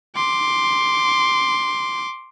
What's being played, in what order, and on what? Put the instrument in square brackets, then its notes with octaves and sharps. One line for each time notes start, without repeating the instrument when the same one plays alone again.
[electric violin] C6 D6